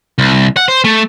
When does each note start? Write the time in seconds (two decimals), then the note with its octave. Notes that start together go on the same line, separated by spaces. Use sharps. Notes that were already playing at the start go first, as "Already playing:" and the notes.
0.18 C2
0.57 F#5
0.68 C5
0.84 A3